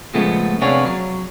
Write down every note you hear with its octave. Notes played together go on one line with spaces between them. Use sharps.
A#2 C#3 F3 G#3 A3 B3
C3 B3 D4 G#4 C#5 F5
F#3